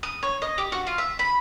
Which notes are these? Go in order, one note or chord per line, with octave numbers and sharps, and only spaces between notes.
D#6
C#5
D#5
G4
F#4
F4
E5
B5